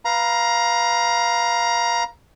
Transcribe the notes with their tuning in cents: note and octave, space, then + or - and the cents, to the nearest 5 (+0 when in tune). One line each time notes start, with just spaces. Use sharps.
B4 +0 F5 +0 A#5 +15